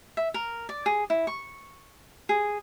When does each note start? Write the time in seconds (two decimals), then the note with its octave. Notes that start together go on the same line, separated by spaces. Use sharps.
0.17 E5
0.34 A#4
0.69 D5
0.86 G#4
1.10 E4
1.27 C#6
2.29 G#4